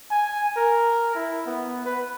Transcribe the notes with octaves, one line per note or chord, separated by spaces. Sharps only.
G#5
A#4
E4
B3
B4